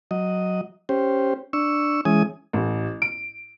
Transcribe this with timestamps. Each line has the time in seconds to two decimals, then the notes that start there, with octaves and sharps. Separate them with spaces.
0.11 F#3 D#5
0.89 C#4 G4 C5
1.53 D4 C#6 E6
2.05 E3 G#3 C#4 G#5 D#6
2.53 A1
3.02 D7